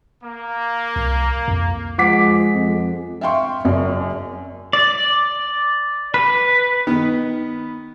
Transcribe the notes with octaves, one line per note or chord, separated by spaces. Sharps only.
A#3
C2
F2
F3 G#3 F#5 D6 B6
F2
E5 F5 G5 C6 C#6
F#1 F#2 D5
D5
B4
D#3 B3